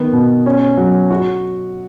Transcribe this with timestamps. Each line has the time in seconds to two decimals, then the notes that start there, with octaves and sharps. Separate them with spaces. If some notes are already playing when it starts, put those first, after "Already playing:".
Already playing: D#3 B3
0.13 B2
0.46 C#4
0.77 F#3
1.10 F#4